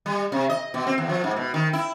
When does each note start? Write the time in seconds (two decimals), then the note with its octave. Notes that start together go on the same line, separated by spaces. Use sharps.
0.06 G3
0.32 C3
0.50 D#5
0.74 B2
0.87 C4
0.98 E2
1.09 F3
1.24 G#2
1.36 B2
1.54 D#3
1.73 E4